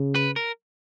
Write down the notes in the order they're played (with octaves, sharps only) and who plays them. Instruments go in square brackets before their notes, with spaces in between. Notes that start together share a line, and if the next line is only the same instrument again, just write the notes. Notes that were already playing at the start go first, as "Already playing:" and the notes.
Already playing: [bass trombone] C#3
[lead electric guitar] B4
A#4